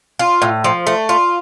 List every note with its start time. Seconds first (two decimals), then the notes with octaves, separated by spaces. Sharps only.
0.19 F4
0.42 A2
0.64 F3
0.87 A3
1.09 F4